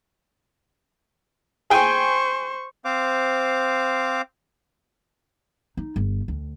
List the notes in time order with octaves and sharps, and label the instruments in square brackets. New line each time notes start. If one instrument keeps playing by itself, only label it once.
[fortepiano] G#4 G5 G#5 [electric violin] C5 C#6
[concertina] C4 C5 F5 D6
[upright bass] D#4
G1
D2